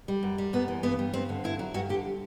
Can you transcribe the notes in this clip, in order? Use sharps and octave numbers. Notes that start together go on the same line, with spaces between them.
G3
F#2
G3
F#2 B3
E3
G2 B3
G3
G2 C4
D3
G2 E4
F#3
G2 F#4
D3 G4